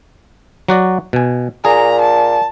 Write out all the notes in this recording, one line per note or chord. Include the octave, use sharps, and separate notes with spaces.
F#3 F#4 D5
B2 G#5
A#2 G#4 A#5
A5